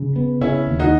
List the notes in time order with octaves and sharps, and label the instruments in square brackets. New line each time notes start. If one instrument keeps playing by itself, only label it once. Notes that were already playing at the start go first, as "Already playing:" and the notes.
Already playing: [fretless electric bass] C#3
B3
[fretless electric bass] C#3 [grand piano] C#4 E4
[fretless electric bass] D#2
[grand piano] D#4 F#4